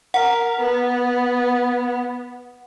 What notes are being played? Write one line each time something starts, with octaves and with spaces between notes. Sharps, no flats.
A#4 F#5
B3